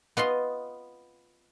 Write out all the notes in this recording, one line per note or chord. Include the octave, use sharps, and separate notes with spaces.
B3 F4 D#5 C6